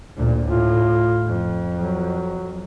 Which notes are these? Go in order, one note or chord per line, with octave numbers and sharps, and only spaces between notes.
D2 A#2
A2 F4
F2
F#3